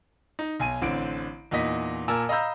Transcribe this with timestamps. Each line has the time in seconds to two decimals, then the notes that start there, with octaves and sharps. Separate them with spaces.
0.39 D#4
0.60 B1 G#5 D#7
0.82 A1 D3 C4 D7
1.51 E2 A#2 D#4 D#5 B6
2.08 A#2 A#4 G#5 A5 E6 E7
2.29 D#5 F5 A#5 B5 E6 G6